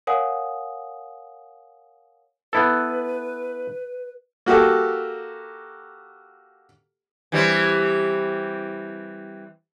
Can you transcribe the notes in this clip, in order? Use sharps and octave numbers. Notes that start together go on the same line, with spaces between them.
A#4 C#5 F5 F#5 G#5 D#6
B3 E4 A4 B4
A#3 F#4 G4 A4
E3 G3 C4